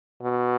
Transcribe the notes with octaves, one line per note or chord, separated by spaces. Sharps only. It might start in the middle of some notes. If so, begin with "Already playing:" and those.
B2